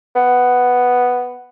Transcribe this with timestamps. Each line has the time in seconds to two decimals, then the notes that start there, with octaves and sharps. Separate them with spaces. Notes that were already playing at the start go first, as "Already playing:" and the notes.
0.16 B3